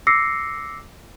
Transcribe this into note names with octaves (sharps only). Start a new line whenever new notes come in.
D6 E6 A#6 C7 C#7